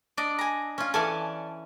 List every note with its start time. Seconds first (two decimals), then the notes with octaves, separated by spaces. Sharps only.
0.17 D4 D5 D#5
0.39 G#5 A#5
0.78 C#4 F4
0.94 E3 A4 D5 G#5 A5